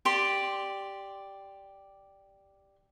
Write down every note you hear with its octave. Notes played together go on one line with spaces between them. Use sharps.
G4 D5 C6